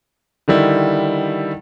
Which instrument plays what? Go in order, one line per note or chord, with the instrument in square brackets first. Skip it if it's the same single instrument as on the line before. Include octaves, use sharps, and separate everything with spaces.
[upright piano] D3 D#3 G3 E4